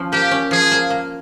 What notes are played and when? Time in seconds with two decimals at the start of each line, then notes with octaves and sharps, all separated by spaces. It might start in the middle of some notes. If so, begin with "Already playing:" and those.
Already playing: F3 C#4
0.13 A#3 G4
0.31 C#4
0.51 F3 G#4
0.71 A#3
0.90 A#3